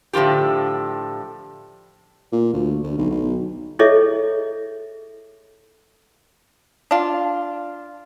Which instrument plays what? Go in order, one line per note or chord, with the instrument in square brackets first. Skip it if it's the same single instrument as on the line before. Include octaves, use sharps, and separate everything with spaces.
[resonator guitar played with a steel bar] A2 D3 F3 F4 G4
[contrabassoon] A#2
D2
D2
B1
B1
[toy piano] E4 G#4 A4 C#5 D#5 E5
[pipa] D4 F4